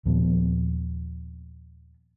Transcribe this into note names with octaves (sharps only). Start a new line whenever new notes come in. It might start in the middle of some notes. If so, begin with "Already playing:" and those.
D#2 A#2 F3 B3